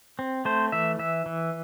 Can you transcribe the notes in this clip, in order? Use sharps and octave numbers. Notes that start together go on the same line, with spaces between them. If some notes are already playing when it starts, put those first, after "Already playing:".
C4
A3 C5
E3 E5
E3 E5
E3